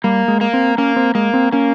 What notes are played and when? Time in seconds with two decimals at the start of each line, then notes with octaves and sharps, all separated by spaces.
0.04 G3 A#3
0.28 G#3
0.41 A#3
0.54 C4
0.78 A#3 C#4
0.96 C4
1.15 G#3 A#3
1.34 C4
1.52 A#3 C#4